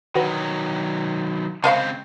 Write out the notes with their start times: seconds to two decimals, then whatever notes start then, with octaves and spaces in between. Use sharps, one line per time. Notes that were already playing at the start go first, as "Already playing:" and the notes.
0.15 D#3 F#3 F#4 B4
1.64 C#3 G#3 C4 C5 F5 A5 B5 C#6